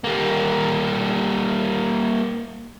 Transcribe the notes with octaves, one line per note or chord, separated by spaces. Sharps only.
G3 A#3